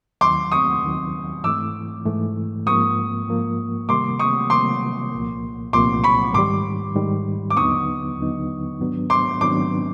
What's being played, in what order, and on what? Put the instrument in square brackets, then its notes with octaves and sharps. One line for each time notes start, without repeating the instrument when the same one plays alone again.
[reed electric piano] D#2 D#3 F#3 [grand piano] C6 D6
[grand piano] C#6 D#6
[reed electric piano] D#2 D#3 F#3
[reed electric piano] G#2 E3 A3 [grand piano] D6 E6
[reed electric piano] G#2 E3 A3
[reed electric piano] G#2 F3 A#3 [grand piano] C#6 D#6
[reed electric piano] G#2 F3 A#3
[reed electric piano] C3 D#3 G3 A#3 [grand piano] C6 D6
[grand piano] C#6 D#6
[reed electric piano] C3 D#3 G3 A#3 [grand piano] C6 D6
[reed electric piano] C2 A#2 F3 A#3
[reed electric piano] C2 A#2 F3 A#3 [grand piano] C6 D6
[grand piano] B5 C#6
[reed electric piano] G#2 D#3 G3 [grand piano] C6 D6
[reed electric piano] G#2 D#3 G3
[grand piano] D6
[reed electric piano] D#2 D3 F#3 B3 D#4 [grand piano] C#6 D#6
[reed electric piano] D#2 D3 F#3 B3 D#4
G#2 D#3 F#3 B3 D4
[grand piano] C6 D6
[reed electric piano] G#2 D#3 F#3 B3 D4 [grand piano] C6 D6